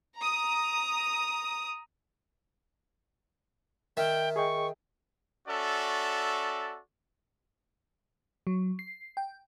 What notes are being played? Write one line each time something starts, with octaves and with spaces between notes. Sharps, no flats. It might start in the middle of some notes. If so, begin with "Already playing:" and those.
A#5 D#6
D#3 E5 G5 F6
G#4 D#5 G5 C#6
C#4 F#4 A4 D5 E5
F#3
C7
G5